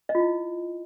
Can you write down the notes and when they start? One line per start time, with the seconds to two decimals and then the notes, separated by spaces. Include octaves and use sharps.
0.09 D#5
0.15 F4
0.20 E4